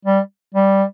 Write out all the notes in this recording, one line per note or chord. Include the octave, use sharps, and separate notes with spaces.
G3
G3